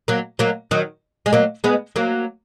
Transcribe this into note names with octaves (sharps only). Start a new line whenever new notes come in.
F#3 A#3
F#3 A#3
D#3 F#3
G#3
F#3 A#3
G#3 B3
F#3 A#3